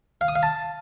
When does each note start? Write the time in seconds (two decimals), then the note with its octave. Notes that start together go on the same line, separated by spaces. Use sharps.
0.21 F5
0.28 D#6
0.36 F5
0.43 A5